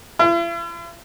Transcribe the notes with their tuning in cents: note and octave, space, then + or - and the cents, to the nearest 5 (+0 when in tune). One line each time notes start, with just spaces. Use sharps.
E4 +45 E5 +45